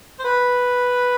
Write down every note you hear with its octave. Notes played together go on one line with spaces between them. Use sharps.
C5
B4